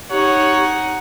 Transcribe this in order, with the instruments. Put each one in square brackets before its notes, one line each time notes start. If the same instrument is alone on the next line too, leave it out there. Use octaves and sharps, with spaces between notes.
[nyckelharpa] D#4 F#5 [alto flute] G4 [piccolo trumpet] C#5